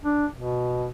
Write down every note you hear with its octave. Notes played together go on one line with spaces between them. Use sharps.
D4
B2